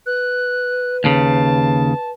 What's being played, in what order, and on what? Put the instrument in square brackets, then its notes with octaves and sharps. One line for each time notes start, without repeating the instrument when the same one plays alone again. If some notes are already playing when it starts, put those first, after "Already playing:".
[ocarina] B4 [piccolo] F#6
[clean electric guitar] D#2 C#3 [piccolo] A5